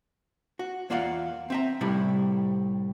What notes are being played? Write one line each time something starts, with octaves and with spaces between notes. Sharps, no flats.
F#4
E2 A#3 F4 D5 F5 F#5
C4 E5 A#5
C2 A2 C3 G3 E4 B5